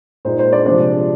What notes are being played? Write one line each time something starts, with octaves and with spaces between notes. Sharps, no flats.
A#2 G#3 D#4 C5
C5
D4 D5
C3 F3 G#3 C4 D4 D5